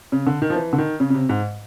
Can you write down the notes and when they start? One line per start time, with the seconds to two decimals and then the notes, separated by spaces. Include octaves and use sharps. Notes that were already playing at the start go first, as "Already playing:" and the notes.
0.12 C#3
0.27 D3
0.42 D#3
0.50 F3
0.56 E3
0.73 D3
0.78 D#3
1.00 C#3
1.10 C#3
1.14 C3
1.29 G#2